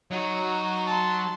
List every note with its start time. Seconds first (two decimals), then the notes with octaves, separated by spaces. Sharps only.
0.11 F#3 D#4 F#4
0.86 A5 C6